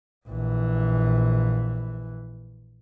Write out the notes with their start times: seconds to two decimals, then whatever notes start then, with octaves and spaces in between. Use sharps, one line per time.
0.27 A#1 E3